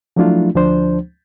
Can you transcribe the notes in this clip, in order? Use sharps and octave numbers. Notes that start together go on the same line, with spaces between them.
F3 F#3 A3 D4 E4 F4
D2 F3 D4 C5